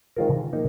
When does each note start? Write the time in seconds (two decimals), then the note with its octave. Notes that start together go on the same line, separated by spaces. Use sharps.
0.16 D#3 G#3 C4 F4 A#4
0.53 F3 A#3 D#4